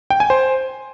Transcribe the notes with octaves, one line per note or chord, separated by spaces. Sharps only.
G5
G#5
C5